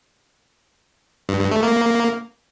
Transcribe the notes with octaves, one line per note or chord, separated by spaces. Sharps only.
G2
G2
A3
A#3